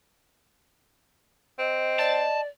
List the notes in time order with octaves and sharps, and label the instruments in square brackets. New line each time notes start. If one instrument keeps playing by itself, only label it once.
[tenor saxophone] C4 [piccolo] D#5
[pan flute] D5 [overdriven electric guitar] A5